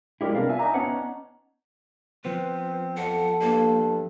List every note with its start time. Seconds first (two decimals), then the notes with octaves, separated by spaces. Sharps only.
0.21 G3 G#3 E4 G4 A#4
0.35 C3 B3 D4 A#4 D5 F5
0.48 F4 E5 G#5
0.59 D4 D#4 A#5
0.74 B3 C#4 F#5
2.25 F3 B3 C4 B4
2.98 F2 A4 F#5
3.41 G2 A#3